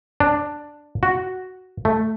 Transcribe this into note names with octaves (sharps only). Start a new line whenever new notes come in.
D4
F#4
A3